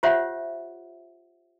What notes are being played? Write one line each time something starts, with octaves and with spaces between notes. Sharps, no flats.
F4 G4 C5 C#5 E5 F#5